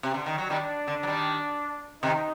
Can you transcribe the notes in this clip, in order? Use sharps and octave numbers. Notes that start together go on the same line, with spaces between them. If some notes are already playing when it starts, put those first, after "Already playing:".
C3
D3
D#3
F#3
D#3 G3 D4
D3
F#3
D#3 G3
C3 D#3 D#4